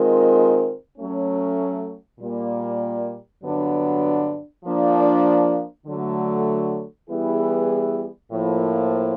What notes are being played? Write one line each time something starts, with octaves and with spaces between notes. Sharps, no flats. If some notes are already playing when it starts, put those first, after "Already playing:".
Already playing: D#3 G#3 C4 F4 A#4
F#3 A3 C#4
A#2 G3 A#3
G2 D3 F#3 B3 D4
F3 A#3 D4
D3 F#3 A3
E3 G3 B3 E4 G#4
A2 F3 A#3